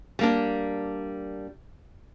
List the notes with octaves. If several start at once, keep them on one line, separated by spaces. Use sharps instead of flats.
G3 A#3 D4